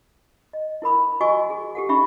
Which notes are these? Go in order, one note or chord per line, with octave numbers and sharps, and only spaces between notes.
D#5
E4 A#4 B5 D#6
F#4 D#5 G#5 C#6 D#6 E6
G#4
G4 A4 F#5
C#4 D#4 E5 B5 C#6